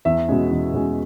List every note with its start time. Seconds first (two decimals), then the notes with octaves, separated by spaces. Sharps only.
0.05 E2 E5
0.28 B2 G#3 C#4
0.51 E2
0.73 B2 G#3 C#4